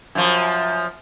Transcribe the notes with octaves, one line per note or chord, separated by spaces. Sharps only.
F#2 F3